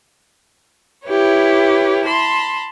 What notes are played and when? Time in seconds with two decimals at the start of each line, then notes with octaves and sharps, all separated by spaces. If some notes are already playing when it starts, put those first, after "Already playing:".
1.06 E4 G4 B4 C#5
2.05 A5 B5 C6